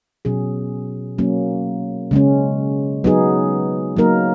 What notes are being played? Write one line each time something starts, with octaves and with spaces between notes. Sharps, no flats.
B2 F#3 C#4 G#4
F#3 A#3 C#4
C#3 G#3 C#4
F#3 B3 D#4 G#4
F#3 A#3 D#4 A#4